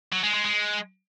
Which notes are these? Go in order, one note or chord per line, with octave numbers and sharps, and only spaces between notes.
F#3
G#3
G#3
G#3